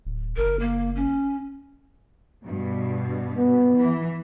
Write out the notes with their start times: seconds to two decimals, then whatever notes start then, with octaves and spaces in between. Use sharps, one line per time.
0.05 D1
0.37 F#1 A#4
0.60 A#3
0.96 C#4
2.44 G2 B2
3.37 B3
3.74 E3